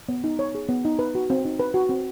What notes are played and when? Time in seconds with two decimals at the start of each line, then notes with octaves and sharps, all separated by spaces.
0.09 B3
0.24 D#4
0.39 C#5
0.55 G#4
0.69 B3
0.85 D#4
0.99 B4
1.15 F#4
1.30 C4
1.45 D#4
1.60 B4
1.74 F#4
1.89 C4